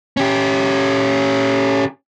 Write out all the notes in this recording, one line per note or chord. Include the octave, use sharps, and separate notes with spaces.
C#4 G4